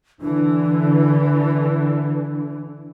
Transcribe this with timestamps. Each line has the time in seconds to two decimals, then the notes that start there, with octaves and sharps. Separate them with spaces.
0.22 D3 E3 D4